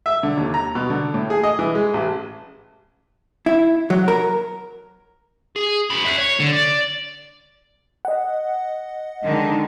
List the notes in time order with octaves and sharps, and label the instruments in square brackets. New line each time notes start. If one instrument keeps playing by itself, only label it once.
[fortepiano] E5
D3
D#2
A#5
B2
D3
A2
G#4
D#5
E3
G#3
A1
[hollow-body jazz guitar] E4
F#3
A#4
[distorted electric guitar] G#4
F#2 B5
E5 F#5
C#5
D3
D5
[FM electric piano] D#5 F#5
[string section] D3 D#3 G#3